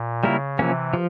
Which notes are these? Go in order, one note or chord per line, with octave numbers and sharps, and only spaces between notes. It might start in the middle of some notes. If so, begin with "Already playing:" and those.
Already playing: A#2
C#3 G3 A#3 E4 A#4
C3 E3 F3 A#3 C#4
F3